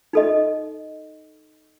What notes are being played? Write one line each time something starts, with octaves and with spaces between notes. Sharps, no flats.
D#4 A4 D#5